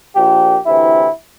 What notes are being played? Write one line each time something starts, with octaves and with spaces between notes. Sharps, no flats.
A#1 A#2 F3 G4
D2 C3 E3 E4